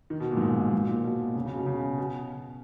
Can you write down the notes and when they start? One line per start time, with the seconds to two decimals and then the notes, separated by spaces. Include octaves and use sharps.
0.10 D#3
0.20 B2
0.31 A#2
0.37 G#2
0.42 A#2
0.73 G#2
0.89 A#2
1.04 B2
1.36 C#3
1.46 C#3
1.56 B2
1.66 C#3
1.98 B2